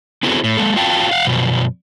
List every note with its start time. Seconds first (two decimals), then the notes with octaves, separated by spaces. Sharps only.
0.23 B3 C4 E4 F#4 G#4 A4
0.44 A2
0.57 G#3 A#3 A4
0.76 F4 F#4 F5 G5 A5
1.11 F5 F#5
1.25 F#2 B2 F3